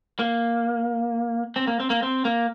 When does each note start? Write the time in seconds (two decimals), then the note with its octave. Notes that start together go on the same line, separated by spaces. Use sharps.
0.19 A#3
1.56 C4
1.67 A#3
1.80 C4
1.90 A#3
2.02 C4
2.25 A#3